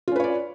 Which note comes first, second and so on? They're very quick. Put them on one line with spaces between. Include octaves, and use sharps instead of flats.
F4 C#4 B4 C#5 D5